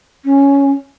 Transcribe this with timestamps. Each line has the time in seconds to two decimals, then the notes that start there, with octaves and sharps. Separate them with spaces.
0.25 C#4